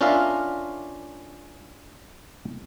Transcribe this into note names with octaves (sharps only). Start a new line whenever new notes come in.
C#4 D4 F4 A#4 E5 F5